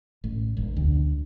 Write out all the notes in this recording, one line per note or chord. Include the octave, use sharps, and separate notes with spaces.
A1
E1
D2